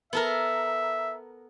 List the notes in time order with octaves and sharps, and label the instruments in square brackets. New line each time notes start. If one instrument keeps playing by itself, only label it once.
[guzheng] B3 A4 A#4 [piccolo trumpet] E5